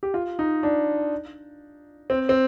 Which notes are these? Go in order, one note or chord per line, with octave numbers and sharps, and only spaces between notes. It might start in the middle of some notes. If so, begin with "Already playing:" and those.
G4
F4
D#4
D4
C4
C4